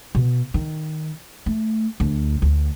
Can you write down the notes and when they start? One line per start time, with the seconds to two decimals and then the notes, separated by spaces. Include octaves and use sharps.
0.15 B2
0.54 D#3
1.46 A3
2.00 D2
2.42 D2